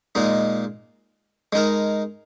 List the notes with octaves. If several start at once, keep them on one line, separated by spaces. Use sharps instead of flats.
A#2 G#3 D#4
G#3 D#4 A#4